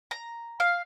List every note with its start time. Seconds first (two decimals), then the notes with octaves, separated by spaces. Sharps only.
0.11 A#5
0.60 F5